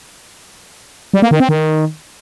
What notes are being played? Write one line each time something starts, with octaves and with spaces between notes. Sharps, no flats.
G3
A#3
D#3
C4
D#3